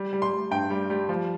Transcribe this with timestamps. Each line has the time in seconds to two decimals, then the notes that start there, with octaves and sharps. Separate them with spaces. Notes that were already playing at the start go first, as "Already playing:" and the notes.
Already playing: G3
0.13 G3
0.22 C6
0.32 G3
0.51 G2 G5
0.70 G3
0.90 G3
1.09 F3